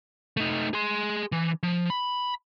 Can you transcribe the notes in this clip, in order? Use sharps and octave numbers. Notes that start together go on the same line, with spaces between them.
A3 D#4
G#4 C6
E3
F3
B5